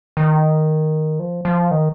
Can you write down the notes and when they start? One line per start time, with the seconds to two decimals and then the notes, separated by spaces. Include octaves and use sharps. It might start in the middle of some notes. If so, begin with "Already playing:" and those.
0.17 D#3
1.19 F3
1.45 F3
1.71 D#3